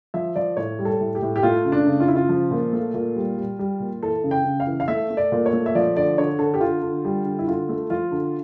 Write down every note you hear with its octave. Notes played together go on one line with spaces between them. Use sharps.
F3 E5
F3 D5
A2 C#5
G3
A4
A2
G4
A2
G4
A3 F4
C#3
D4
C#3
F4
C#3 E4
F4
F3
A#2
A3
A#2
G3
G3
G3
A#2
E3 A4
C#3
G5
C#3
F5
E3
F5
A3 E5
A3
D5
A#2
C#5
A3
E5
F3 D5
D3 D5
D3 C#5
D3 A4
G4
D3 F4
D3
G3
D3
E4
D3 F4
A3
F3 F4
D3